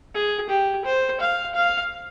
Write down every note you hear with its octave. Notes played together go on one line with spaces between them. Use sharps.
G#4
G4
C5
F5
F5